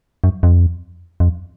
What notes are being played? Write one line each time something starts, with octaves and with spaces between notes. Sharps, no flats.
F#2
F2
F2